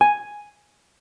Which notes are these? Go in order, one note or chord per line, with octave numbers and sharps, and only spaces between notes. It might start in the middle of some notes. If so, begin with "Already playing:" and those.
G#5